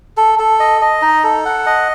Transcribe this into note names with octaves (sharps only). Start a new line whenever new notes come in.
A4
A4
D#5
D#5
D#4
A4
F#5
D#5